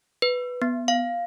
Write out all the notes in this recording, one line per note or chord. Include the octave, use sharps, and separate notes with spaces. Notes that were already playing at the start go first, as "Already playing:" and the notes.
B4
B3
F5